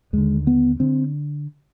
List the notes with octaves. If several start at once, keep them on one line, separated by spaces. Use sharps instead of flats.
D#2 D3 G#3
B3
D3 C4